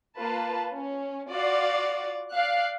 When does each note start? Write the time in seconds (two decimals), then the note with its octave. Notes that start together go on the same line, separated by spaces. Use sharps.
0.18 A#3 F4 B4 A5
0.75 C#4
1.30 F4 F#4 D5 F5
2.32 D5 F5 F#6